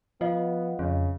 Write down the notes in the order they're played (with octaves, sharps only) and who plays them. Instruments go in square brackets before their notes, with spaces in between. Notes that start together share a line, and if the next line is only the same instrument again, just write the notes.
[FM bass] F3 [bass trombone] B3 [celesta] F4 D#5 F5
[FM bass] F2 [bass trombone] C#3